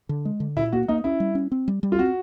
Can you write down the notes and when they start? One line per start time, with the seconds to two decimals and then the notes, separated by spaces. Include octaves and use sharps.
0.09 D3
0.25 G#3
0.40 D3
0.56 A#2 E4
0.72 A#3 F#4
0.88 A#3 D#4
1.04 C#4 E4
1.20 G3
1.35 C#4
1.52 C4
1.68 G3
1.83 G3
1.92 F4
1.99 C4 F#4